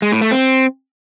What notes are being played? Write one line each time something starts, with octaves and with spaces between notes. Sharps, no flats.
G#3
A2
A3
C4